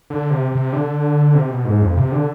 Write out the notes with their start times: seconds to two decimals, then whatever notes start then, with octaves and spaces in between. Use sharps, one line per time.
0.10 D3
0.30 C3
0.52 C3
0.73 D3
1.34 C3
1.50 B2
1.65 G#2
1.82 F2
1.97 C3
2.12 D3